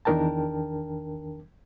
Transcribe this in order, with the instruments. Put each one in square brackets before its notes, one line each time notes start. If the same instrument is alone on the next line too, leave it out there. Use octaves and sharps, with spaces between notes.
[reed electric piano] E2 D#3 D4 A#4 G5 A5